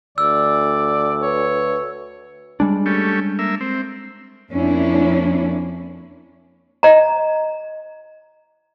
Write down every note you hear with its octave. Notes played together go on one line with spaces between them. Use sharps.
D2 D5 E6
B4 C#5
G3 G#3 D4
A3 C#4 G4
A#3 E5
C4
F2 A#3 C#4 D4 E4
D#5 A#5